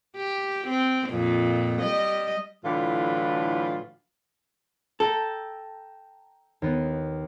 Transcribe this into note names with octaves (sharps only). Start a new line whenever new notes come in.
G4
C4
F2 A#2
G3 D#5
A2 D3 E3 F#3 F4
A4 G5 A#5
D#2 B3